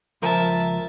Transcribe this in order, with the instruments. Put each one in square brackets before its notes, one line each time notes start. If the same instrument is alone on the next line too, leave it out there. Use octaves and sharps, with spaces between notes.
[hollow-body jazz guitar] C#2 F3 A#4 [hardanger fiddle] E5 A5